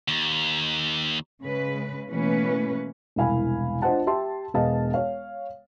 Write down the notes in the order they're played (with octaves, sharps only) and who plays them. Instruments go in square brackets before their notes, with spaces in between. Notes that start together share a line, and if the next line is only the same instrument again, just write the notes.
[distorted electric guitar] D#2
[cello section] C#3 G#3 B4
B2 E3 A3 A#3 C#4 B4
[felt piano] E1 C2 E4 F5 G#5 B5
D4 F4 C5 D#5 F#5 A5
G4 E5 G5 A5 C6
E1 B3 G#4 D#5 F5 A5
C#5 F5